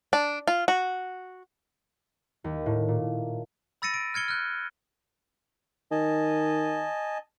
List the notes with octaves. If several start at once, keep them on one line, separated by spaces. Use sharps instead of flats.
D4
F4
F#4
D#2
A2
A#2
B5 E6 A6 A#6 C#7 D#7
D7
F6 G#6 C#7 G7
F6 F#6
D#3 D#5 G#5 A5